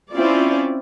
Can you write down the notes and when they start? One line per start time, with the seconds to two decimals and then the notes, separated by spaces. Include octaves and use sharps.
0.13 C4 C#4 E4 F4 D5